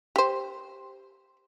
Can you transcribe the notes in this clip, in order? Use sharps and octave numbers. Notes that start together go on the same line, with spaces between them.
G4 C5